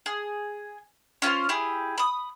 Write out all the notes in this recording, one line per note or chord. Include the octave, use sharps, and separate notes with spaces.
G#4
C#4 F4 A#4 C5
E4 G4 G#4
B5 D#6